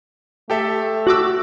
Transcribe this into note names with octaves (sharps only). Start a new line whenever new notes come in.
A3 G4 A4 E5
F#4 D6 E6